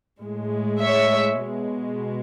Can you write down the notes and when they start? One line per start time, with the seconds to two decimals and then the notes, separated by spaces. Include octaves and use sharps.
0.22 A2 G#3
0.81 C#5 E5
1.41 B2 G#3